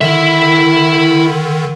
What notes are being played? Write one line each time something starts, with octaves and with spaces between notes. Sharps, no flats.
D3 D#3 E4 E5